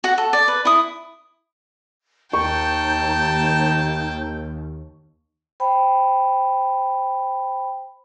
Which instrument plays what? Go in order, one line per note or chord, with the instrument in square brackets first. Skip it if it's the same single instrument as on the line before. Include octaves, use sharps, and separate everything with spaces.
[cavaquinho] F#4 F#5
A4
D5
B4
E4 D#6
[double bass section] D#2 [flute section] D#4 G6 [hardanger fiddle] G5 A5 [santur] C#6
[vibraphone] C5 G5 B5